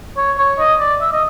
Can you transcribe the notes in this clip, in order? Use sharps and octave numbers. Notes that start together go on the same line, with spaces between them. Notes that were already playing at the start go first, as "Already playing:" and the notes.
C#5
C#5
D#5
D5
E5
D#5